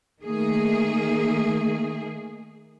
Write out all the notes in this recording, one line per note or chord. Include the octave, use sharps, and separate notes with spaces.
D#3 A3 A#3 G#4